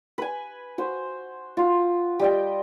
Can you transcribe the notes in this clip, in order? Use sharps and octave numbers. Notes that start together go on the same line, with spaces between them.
B4 G#5
F#4 C5
F4 F#4
G3 D#5 G5